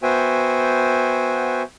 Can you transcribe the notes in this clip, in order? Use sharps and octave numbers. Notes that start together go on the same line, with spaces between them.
B3 F#4 C5 E5 G5 G#5